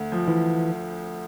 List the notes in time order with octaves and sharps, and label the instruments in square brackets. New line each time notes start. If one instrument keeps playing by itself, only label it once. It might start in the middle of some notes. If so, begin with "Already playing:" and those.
Already playing: [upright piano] D2
F3
[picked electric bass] E3